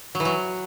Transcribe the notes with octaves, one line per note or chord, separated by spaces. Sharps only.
F#3
E3
F#3